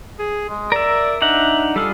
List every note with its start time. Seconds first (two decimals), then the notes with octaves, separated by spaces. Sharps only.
0.19 G#4
0.49 G#3
0.72 A#4 D5 E5
1.22 D4 D#4 E5 F#5
1.76 G3 F4 G#4 A4